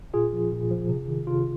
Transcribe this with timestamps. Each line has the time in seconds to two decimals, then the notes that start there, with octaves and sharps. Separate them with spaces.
0.14 A#2 F4 G#4
0.33 F3
0.52 A#2
0.71 F3
0.89 C3
1.08 D#3
1.27 C3 F4